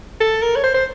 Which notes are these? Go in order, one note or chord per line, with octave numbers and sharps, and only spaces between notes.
A4
A#4
C#5
C5
C5